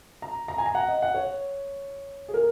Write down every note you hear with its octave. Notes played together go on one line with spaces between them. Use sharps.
A#5
A#5
G#5
A#5
F#5
D#5
F#5
C#5
G#4
A#4